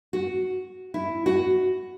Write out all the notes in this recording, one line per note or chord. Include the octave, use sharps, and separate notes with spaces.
F#4
E4
F#4